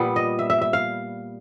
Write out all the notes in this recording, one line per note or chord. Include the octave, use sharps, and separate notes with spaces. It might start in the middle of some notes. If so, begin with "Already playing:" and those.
Already playing: A#2 G3 B3
D#5
E5
E5
E5
F5